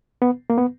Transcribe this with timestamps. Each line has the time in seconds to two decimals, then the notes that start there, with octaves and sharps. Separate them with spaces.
0.22 B3
0.50 A#3
0.58 B3